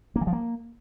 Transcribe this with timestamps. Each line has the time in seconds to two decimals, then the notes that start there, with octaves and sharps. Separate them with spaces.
0.16 A#3
0.21 E3
0.27 F3
0.33 A#3